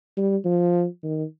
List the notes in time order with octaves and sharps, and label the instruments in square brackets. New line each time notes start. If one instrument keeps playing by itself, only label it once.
[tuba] G3
F3
D#3